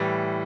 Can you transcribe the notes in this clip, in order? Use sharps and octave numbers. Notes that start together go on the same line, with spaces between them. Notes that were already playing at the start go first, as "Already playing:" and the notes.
Already playing: A2 E3 G3